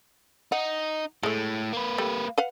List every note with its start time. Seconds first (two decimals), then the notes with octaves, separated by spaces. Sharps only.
0.52 D#4 F#5
1.23 A2 G#3 A3
1.73 A#3 B4
1.98 G3 A3
2.38 B4 F5 F#5